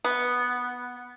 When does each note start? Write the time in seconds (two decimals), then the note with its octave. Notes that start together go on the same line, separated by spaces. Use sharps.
0.04 B3